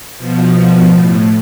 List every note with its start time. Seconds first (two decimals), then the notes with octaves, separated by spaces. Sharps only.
0.17 B2 F3
0.89 A2